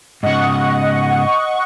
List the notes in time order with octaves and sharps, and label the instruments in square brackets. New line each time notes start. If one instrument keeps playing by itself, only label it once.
[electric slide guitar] G#2 C#3 [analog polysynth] D#5 F#5 C#6